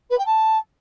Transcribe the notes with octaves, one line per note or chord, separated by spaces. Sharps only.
B4
G5
A5